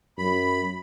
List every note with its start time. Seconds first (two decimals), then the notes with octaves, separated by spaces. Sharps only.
0.18 F#2 B5